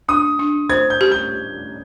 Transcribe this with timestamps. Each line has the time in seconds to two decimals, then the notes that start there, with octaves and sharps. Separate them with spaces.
0.09 D4 D#6
0.39 D4
0.70 C5 G#6
0.90 G6
1.01 G4
1.12 G6